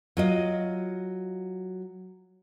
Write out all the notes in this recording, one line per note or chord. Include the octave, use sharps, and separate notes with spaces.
F#3 F4 D#5